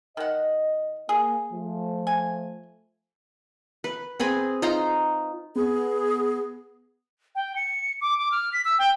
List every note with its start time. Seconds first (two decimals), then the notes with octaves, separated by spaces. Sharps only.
0.17 D#3 D#5 F#5
1.09 A#3 G#4
1.52 F3 A3
2.07 G#5
3.84 B4
4.20 C4 G#4 B4 G#5
4.62 D#4 F4 A#5 C6
5.56 B3 G#4
7.35 G5
7.56 C#7
8.01 D6
8.18 D6
8.32 F6
8.53 B6
8.65 E6
8.79 G5